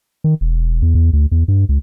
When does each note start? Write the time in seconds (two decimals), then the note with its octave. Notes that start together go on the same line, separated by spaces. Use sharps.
0.24 D#3
0.41 E1
0.82 E2
0.95 E2
1.13 D2
1.32 E2
1.48 G2
1.69 C#2